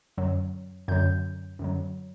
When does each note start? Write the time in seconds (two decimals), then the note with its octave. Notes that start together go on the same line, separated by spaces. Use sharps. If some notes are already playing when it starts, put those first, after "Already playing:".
0.17 F#2 D3 F#3
0.88 F#2 D3 F#3 G6
1.59 F#2 D3 F#3